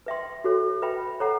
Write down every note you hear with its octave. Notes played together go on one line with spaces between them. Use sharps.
B4 E5 G5 C6
F#4 A4 C#5
B4 E5 G5 B5
A4 C#5 F#5 A#5